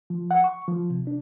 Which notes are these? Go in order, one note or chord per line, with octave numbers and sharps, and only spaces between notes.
F3
F#5
C#6
F3
C3
D4